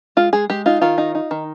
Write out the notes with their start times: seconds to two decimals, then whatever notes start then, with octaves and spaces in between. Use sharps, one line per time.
0.17 G#3 F4
0.33 G#3 G#4
0.50 G#3 G4
0.66 D#4 F4
0.81 D#3 F4
0.98 D#4
1.15 D#4
1.31 D#3